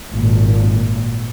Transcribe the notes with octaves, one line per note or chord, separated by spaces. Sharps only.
G#1 A#2